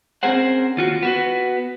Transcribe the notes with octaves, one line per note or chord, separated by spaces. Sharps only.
C4 C#4 G#4 A#4 C5 F#5
D#2 F4 F#4
B3 F#4 B4